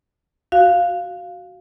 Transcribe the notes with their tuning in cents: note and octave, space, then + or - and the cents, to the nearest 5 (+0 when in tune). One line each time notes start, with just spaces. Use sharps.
F#4 +5 F5 +0